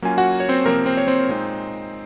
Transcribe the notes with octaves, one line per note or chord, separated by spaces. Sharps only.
F#3 A#3 C#4 F4 G#5
F#4 F#5
C#5
C4 C5
C3 F3 A#3 C4 A#4
C4 C5
C#5
C4 C5
A#2 G#3 C4 D#4